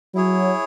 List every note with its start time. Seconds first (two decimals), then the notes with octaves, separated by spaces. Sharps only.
0.15 F#3 E4 G#4 C#5